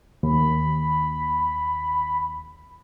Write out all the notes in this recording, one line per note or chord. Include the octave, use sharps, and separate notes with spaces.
D#2 B5